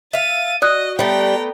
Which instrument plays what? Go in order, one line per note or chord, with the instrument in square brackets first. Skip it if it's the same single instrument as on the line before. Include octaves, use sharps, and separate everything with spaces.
[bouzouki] E5 F5 [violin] A6 D#7
[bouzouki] F#4 [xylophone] D5 D#6 F#6 [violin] D#5
[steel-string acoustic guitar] G3 [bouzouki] A3 B3 [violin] G5 A#5